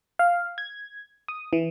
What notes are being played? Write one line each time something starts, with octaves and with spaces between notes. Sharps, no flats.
F5
G#6
D#6
E3